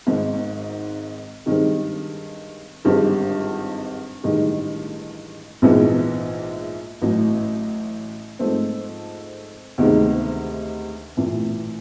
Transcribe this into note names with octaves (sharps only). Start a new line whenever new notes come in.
G#1 G#2 D#3
G2 D#3 G#3 C4
G#1 G2 D3 F3 G#3
A1 G2 D#3 G#3
A#1 G#2 E3 G#3 B3
A1 A2 F#3
G#2 F3 A3 C4
D2 C3 D#3 G#3 B3
A#1 A2 E3